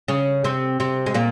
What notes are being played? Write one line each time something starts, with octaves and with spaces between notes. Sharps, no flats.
C#3 C#4
C3 C4
C3 C4
G#3
A#2 A#3